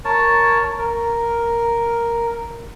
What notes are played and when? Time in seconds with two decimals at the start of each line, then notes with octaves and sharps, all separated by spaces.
0.05 A#4 C#5 A5
0.79 A#4